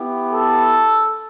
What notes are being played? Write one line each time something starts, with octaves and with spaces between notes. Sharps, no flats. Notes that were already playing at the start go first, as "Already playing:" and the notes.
Already playing: B3 E4 G4
A4